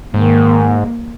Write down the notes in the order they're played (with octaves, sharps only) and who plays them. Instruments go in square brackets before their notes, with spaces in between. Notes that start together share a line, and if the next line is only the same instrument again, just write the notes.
[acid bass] G#2 [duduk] D#3 [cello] A#3